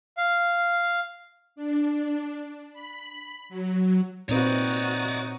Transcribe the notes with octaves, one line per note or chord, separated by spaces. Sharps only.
F5
D4
B5
F#3
A#2 C4 D#4 F#4 B4 C#5 D5